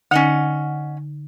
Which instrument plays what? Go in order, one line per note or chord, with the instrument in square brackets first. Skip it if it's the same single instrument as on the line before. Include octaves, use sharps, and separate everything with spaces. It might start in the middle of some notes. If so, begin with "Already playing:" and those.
[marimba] D3 D#4 [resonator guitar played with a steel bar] C#4 D#5 F#5